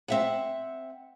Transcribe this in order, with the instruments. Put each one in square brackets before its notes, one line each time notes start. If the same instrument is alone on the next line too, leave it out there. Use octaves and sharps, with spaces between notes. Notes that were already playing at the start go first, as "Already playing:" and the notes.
[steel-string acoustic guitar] C4 E5 F#5